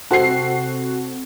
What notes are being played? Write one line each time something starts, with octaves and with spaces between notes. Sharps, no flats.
C3 C4 F#4 A4 C7